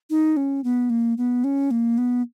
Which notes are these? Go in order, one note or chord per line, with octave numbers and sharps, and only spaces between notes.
D#4
C#4
B3
A#3
B3
C#4
A#3
B3